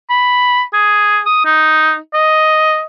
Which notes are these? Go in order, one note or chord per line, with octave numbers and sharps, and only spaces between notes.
B5
G#4
D#6
D#4
D#5